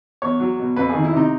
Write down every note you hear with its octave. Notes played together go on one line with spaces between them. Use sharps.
E2 C#5
F#3
B2
F2 B4
G#4
D#3
E4
C3 D#4